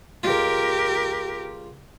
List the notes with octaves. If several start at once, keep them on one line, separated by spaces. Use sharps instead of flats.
C#2 F4 G4 A#4